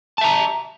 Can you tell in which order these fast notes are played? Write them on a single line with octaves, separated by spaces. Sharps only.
A5 E5 A#5